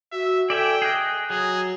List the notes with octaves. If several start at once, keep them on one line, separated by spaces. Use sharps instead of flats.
F#4 E5
A4 D5 E5 G5 G#5
G#4 D#5 F#6
F#3 G#4